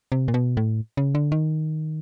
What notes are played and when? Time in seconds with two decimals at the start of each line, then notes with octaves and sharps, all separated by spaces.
0.12 C3
0.28 A#2
0.34 B2
0.57 A2
0.97 C#3
1.15 D3
1.32 D#3